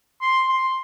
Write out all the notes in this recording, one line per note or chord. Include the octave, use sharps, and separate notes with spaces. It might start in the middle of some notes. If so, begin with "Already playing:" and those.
C6
C6